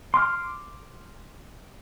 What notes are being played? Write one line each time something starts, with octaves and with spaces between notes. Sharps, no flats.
C6 D6 F6